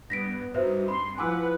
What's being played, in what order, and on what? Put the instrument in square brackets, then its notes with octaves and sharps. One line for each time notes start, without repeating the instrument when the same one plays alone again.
[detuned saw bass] G2 [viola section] B3 [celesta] A#6 B6 D7
[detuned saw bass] G2 [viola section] D#4 [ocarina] F#4 [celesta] B4 C5 E5
[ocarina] C4 [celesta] B5 [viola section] C6
[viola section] F3 B4 F#5 [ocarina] E4 [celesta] G#5 D6 E6